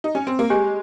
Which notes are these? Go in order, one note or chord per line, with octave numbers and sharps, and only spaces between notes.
D#4
C#4
C4
A#3
G#3 G4 C#5 G#5